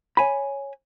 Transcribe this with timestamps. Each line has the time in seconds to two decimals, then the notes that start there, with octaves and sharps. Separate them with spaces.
0.17 C#5 G#5 B5